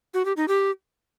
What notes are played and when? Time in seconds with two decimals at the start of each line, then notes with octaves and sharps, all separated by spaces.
0.14 F#4
0.25 G4
0.37 D#4
0.48 G4